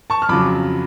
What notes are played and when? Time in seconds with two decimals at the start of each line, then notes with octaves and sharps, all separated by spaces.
0.10 A5 C#6
0.22 F6
0.29 F2 C#3 F#3 B5 D6